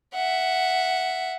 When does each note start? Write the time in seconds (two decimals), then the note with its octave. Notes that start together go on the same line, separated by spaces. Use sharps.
0.14 E5 F#5